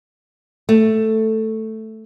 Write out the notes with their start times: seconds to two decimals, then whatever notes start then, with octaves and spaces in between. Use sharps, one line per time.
0.69 A3